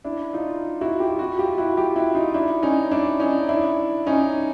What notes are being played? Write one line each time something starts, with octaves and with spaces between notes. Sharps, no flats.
D4 E4
D#4 F4
E4 F#4
F4 G4
E4 F#4
F4 G4
E4 F#4
F4 G4
E4 F#4
D#4 F4
D4 E4
C#4 D#4
D4 E4
C#4 D#4
D4 E4
C#4 D#4